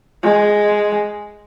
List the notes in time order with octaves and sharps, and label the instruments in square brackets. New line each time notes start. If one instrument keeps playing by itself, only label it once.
[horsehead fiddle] G#3